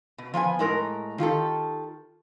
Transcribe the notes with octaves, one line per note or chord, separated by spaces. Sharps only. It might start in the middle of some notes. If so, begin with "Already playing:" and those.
B2
F3 B3 F5 G#5
A2 G#3 A#4
D#3 F4 G4 A4